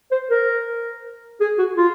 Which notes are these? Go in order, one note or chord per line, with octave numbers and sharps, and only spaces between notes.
C5
A#4
G#4
F#4
F4